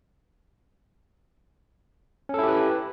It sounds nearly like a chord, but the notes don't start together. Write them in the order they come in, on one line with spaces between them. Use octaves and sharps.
C#4 A4 E4 G4 B4